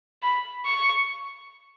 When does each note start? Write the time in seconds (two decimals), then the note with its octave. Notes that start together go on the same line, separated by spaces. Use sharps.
0.23 B5
0.66 C#6